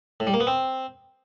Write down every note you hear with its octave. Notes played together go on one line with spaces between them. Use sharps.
A2
G3
A#3
B3
C4